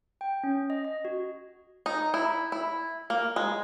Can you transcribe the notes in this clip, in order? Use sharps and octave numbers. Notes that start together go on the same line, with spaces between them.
G5
C#4
D#5
D#5
F#4
D#4
E4
E4
A#3
G#3